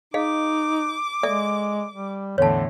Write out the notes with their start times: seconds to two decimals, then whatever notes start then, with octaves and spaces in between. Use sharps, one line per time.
0.14 D#4 G#4 D#5 F5 D6
1.23 G#3 A4 D5 E5
1.91 G3
2.38 E2 A2 D3 C#5 A5